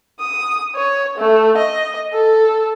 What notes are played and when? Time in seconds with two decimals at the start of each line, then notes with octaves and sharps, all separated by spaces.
0.20 D#6
0.75 C#5
1.18 A3
1.57 D#5
2.13 A4